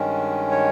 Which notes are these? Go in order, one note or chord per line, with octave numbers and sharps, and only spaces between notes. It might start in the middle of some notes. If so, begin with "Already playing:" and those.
Already playing: G2 D#3 G#3 C#4
C#5